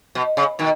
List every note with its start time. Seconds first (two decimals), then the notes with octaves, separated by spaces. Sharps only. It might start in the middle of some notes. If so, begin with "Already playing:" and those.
0.15 B2
0.37 C#3
0.59 B2 D#3